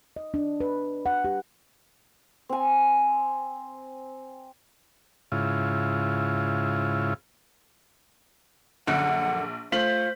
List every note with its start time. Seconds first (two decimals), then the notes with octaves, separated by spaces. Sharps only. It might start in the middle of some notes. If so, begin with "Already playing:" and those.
0.16 D#5
0.34 D4
0.60 B4
1.06 F#5
1.25 G4
2.49 C4 G#5
5.32 G#2 C#3 E4 F4
8.87 A#1 F#2 D3 F#5
9.72 A3 F4 C5 B6 F#7